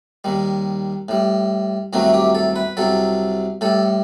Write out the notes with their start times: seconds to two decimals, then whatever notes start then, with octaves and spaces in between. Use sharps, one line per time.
0.24 D#2 D#3 G3
1.09 A2 G3
1.93 C2 C3 D#3 F#3 A3 F#4
2.14 G4
2.35 A4
2.56 B4
2.77 C2 C3 F#3 A4
3.61 A2 G3 A4